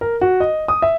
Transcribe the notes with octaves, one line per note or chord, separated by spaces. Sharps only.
A#4
F#4
D#5
D#6
E5